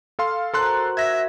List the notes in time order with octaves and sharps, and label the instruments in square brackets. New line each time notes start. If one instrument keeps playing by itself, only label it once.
[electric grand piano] A4 F5 C6
[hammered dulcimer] F#4 A#4 C5 [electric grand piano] A4 C6 F#6
[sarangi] E5 [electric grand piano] G#6 A#6